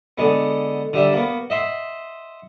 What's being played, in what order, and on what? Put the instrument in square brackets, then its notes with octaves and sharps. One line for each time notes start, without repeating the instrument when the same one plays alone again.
[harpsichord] D3 G#3 B3
D3 G3 E5
A#3 B3
D#5 E5 F#5 C6